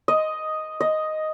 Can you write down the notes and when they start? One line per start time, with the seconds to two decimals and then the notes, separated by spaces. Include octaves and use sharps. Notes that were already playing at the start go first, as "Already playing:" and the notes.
0.08 D#5
0.80 D#5